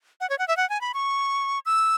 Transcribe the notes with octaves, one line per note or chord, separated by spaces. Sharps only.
F#5
C#5
F#5
E5
F#5
G#5
B5
C#6
E6